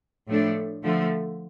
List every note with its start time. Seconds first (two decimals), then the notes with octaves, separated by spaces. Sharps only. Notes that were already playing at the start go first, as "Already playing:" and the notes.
0.27 A2 F3 A3 D4
0.83 D3 F3 A3